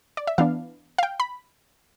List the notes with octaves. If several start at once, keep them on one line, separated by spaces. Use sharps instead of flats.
D5
E5
E3 B3 D4 F5
F5
G5
B5